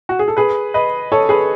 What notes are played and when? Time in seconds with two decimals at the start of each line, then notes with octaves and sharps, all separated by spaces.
0.09 F#4
0.19 G#4
0.28 A4
0.37 G#4 B4
0.74 B4 D#5
1.12 A4 C#5
1.29 G#4 B4